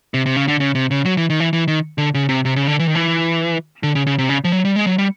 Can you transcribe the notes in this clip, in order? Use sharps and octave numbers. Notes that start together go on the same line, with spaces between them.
C3
C3
C#3
D3
C#3
C3
C#3
F#3
E3
D#3
E3
E3
D#3
D3
C#3
C3
C3
C#3
D3
E3
D#3
E3
D3
C#3
C#3
C3
C#3
F3
F#3
G3
G#3
F#3
G3